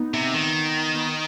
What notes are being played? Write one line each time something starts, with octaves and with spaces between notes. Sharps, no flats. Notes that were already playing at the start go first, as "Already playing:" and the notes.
Already playing: B3 D#4
C3
D#3
B3 D#4